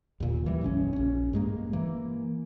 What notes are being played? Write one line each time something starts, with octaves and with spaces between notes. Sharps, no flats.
D#2 A#2
E3 G3
F#1 B1 C4 C#4
A#1 C#4
G2 G#3 A#3
E3 A#3